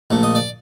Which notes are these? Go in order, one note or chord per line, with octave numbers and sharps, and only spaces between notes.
A#1 A#2 A3
D#5
D5